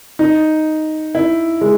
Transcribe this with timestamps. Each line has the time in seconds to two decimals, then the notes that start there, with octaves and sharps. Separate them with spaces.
0.19 D#4
1.15 E4
1.61 G#3